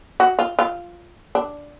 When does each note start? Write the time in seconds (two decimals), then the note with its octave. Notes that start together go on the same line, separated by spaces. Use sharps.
0.20 F#4
0.39 F4
0.59 F4
1.35 D4